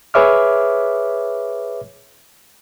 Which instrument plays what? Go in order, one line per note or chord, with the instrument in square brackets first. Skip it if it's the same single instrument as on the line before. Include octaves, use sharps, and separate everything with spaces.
[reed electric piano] G#4 B4 C#5 E5 D6 F6